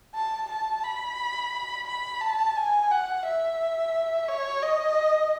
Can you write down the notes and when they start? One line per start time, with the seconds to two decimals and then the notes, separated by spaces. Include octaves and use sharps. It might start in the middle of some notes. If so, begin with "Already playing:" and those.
0.15 A5
0.49 A5
0.84 B5
1.87 B5
2.21 A5
2.56 G#5
2.91 F#5
3.25 E5
4.28 C#5
4.62 D#5